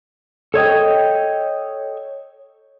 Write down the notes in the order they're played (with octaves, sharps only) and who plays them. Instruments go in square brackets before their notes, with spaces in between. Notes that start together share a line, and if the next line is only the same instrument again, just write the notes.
[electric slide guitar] A4 C#5 D#5 G5